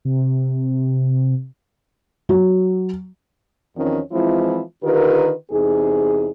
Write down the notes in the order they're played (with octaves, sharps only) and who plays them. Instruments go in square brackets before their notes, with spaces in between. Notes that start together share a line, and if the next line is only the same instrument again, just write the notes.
[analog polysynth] C3
[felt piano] F#3
[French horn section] E2 D#3 F3 C4 C#4
E3 F3 G#3 C4 E4 F4
D3 D#3 F4 G4 A#4 B4
E2 C3 D#4 G#4